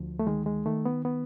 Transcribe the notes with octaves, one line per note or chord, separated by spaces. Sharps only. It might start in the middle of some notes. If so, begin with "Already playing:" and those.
Already playing: D2 F3
A3
D#3 G#3
G#3
D#3 A3
B3
B3